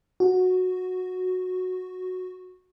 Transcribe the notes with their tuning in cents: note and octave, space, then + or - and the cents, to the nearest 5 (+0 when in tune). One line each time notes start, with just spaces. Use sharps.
F#4 -10